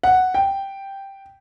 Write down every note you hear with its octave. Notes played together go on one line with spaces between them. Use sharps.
F#5
G5